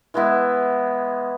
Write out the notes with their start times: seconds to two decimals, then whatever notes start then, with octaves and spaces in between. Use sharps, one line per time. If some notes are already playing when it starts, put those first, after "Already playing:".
0.14 E3 G#3 B3 E4